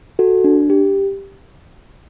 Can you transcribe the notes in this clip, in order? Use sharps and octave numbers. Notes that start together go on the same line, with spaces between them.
F#4 A4
D4
G4